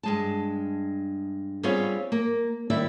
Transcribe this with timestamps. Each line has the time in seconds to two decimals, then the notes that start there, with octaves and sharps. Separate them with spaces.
0.03 G2 G#3 A5
1.63 G3 B3 C4 F4 G#4 C#5
2.12 A#3
2.70 D#2 D#3 G3 E4 D5 E5